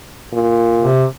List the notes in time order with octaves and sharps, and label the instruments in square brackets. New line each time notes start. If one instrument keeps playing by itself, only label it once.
[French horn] A#2
[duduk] C3